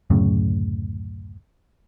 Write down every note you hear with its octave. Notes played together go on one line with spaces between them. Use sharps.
D1 F#2 A2 C#3